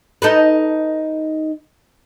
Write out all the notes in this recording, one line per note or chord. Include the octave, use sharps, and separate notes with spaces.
D#4 A4 B4